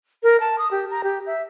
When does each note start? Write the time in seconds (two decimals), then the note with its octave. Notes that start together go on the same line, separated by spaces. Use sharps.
0.23 A#4
0.40 A5
0.58 D#6
0.71 G4
0.91 A#5
1.04 G4
1.26 E5